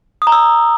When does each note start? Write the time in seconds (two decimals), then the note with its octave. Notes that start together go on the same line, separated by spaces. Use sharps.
0.22 D#6
0.27 A#5
0.32 E6